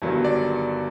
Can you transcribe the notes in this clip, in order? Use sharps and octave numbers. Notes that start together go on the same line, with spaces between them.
G1 G2 D#3 F#3
D5